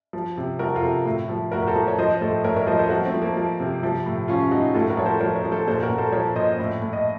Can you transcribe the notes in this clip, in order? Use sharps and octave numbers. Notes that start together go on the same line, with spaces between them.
F3
C3
F3 F#4 A#4
F4 A4
C3
A2
F3
A2 F#4 A#4
A#4
A4 C5
F3
C#5
F3 C5 D#5
A2 A4 C5
A2 A#4 C#5
A#4 C#5
F3 C5 D#5
A4 C5
F3 F#4 A#4
A3 C4
F3
A#3
F3
C3
F3
A2
F3 C#4 F4
F3 D#4 F#4
A2 F4 A4
F#4 A#4
F3 C#5
A4 C5
F3 A#4 C#5
A#4 C#5
F3
A4 C5
A#2 A4 C5
F#4 A#4
A#2
A4 C5
F3 A#4 C#5
A#2 C5 D#5
A2
A2
D#5